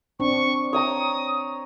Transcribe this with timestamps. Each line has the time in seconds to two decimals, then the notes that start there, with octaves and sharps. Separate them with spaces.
0.20 C4 D4 C#6
0.73 C#5 G5 A#5 D#6